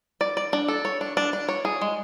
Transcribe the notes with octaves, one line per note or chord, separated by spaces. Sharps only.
D5
D5
D4
A4
C#5
D4
D4
D4
C#5
G#4
G#3